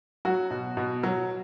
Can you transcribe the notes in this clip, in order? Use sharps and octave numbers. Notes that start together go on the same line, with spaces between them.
F#3 F#4
B2
B2
F#3